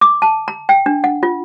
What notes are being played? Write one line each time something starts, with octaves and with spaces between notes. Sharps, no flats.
D6
A5
A#5
G5
D4
F#5
F4